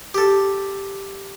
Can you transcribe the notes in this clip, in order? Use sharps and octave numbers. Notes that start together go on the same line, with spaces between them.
G4 A4